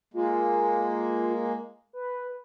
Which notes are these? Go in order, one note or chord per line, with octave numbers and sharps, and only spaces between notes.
G#3 A#3 F4
B4